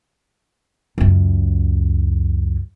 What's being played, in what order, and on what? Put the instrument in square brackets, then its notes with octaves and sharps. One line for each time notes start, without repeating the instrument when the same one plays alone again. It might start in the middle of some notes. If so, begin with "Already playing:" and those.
[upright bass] C#2 F#2